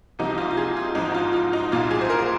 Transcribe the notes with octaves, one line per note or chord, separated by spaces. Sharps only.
C2 C3 F3 A#3 D#4
F4
F4
G#4
F4
G#1 G#2 F3 D#4
F4
F4
D#4
C2 A#2 A#3 F4
G#4
C5
A#4